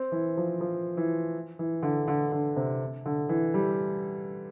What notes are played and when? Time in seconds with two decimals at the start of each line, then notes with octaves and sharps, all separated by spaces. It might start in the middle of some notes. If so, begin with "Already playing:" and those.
Already playing: C4
0.12 E3
0.37 F3
0.61 F3
0.97 E3
1.59 E3
1.83 D3
2.08 D3
2.32 D3
2.56 C3
3.06 D3
3.29 E3
3.54 G3